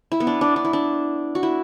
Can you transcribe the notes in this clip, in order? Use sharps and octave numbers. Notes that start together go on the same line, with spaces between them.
E4
B3
D4
D4
D4
E4
D4
F#4
E4